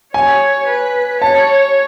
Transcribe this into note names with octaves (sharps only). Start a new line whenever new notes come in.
C#5 G#5
B4
C#5 A5